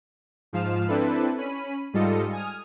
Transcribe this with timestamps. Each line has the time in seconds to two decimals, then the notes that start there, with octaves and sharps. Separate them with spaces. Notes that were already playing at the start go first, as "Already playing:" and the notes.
0.53 G#2 F3 F4 F5 F6 E7
0.88 C4 D4 E4 A4 B4
1.38 C#4 B5 D#7
1.93 G#2 G3 F4 A4 D#5 C#7
2.32 G#5 D#6 F6